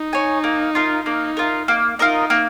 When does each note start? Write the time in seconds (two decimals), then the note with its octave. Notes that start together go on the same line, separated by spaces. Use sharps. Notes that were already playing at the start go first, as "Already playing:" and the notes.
Already playing: D#4
0.13 C#5 G#5
0.44 A#3
0.75 F4 A#4
1.06 A#3 D#4
1.37 F4 A#4
1.68 A#3
1.99 D#4 F4 A#4 D#5
2.30 A#3